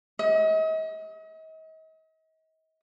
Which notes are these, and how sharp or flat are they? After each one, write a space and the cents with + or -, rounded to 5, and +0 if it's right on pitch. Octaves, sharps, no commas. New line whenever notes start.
D#5 +40